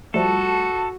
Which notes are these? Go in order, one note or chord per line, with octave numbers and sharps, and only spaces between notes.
F3 G3 A3 F#4 A4 A5